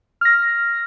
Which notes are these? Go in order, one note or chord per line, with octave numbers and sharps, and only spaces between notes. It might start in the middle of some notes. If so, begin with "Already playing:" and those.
F6 A#6